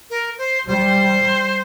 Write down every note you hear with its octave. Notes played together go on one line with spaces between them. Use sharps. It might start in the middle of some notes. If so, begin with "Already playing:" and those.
A#4
C5
G3 C5